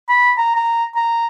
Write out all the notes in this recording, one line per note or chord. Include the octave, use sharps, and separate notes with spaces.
B5
A#5
A#5
A#5